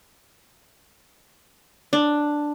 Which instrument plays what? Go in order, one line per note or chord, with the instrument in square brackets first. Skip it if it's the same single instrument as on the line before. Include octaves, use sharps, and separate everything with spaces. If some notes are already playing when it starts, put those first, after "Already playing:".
[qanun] D4